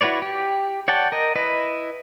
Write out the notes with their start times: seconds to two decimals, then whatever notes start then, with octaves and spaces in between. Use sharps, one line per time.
0.01 E4 F#4 B4 C#5 D5
0.22 G4
0.88 C#5 D5 F#5 G5 A5
1.12 A#4 D#5
1.35 E4 B4 D#5